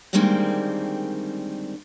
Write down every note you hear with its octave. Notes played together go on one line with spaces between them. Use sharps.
D3 D#3 G3 G#3 A#3 C4